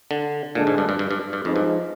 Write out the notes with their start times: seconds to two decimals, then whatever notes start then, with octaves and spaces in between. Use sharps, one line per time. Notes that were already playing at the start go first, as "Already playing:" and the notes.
0.11 D3
0.55 A#2 D3 G#3 D4
0.67 G#2
0.78 G2
0.89 G2
0.99 G2
1.11 G2
1.33 G2
1.44 F2 F3 G#3 D#4
1.56 G2